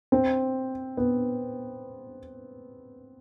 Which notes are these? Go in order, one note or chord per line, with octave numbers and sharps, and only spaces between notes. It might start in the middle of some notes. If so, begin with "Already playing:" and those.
C4
B3